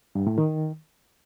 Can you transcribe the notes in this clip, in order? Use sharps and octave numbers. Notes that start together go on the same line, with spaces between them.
G2
A2
D#3